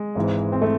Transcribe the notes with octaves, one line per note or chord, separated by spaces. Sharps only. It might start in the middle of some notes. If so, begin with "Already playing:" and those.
Already playing: G#3
G#1 G#2 E3
C4
A3